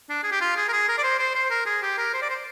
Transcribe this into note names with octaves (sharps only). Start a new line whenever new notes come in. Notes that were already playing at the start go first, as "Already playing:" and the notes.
D4
G#4
G4
F4
G#4
A#4
G#4
A#4
D5
C5
C5
C5
A#4
G#4
G4
A#4
C5
D5
C5